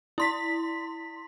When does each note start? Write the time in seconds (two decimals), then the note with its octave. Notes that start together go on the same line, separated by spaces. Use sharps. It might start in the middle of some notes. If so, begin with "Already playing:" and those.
0.18 E4 C6 B6